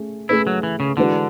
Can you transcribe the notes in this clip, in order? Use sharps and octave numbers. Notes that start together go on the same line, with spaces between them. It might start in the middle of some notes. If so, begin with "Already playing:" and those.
Already playing: A3 C#4 G#4
A3 C#4 E4 G#4 B4
F#3
E3
C#3
D3 E3 G#3 D4 F#4 B4